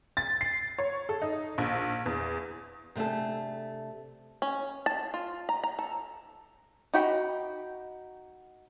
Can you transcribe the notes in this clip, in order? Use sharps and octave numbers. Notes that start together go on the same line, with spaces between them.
A6
C7
C#5
A4
D#4
A#1
E2
C3 A3 D4 G#4 A4
C#4
A5
F4
A#5
A#5
A4
D#4 F#4 G5 B5